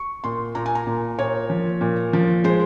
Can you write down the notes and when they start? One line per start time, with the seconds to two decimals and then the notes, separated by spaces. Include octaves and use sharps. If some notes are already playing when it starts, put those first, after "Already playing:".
Already playing: C#6
0.24 A#2 C6
0.55 A#2 A#5
0.66 G#5
0.75 A#5
0.87 A#2
1.19 A#2 C#5
1.50 F3
1.81 A#2
2.13 F3
2.44 G#3 C5